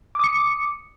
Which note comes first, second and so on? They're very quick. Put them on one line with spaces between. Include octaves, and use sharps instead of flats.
D6 D#6 C#7